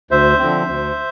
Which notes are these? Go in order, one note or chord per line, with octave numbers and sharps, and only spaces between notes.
D2 C5 E5
D3 F3 C4
D2